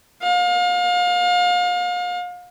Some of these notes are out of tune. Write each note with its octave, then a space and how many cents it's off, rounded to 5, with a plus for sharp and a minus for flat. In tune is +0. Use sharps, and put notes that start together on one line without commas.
F5 +35